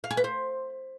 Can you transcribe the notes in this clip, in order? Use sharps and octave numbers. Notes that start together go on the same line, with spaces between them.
F5
G#4
B4
C5